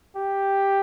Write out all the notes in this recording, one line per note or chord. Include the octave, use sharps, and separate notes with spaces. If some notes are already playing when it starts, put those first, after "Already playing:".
G4